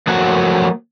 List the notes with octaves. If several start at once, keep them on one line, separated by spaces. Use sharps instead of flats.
F3 F#3 A3 A#3 F#4 F#5